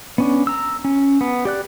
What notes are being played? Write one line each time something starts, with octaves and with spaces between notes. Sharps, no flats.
B3 C#4 D4
A#5 E6
C#4
B3
G4 D5 F#6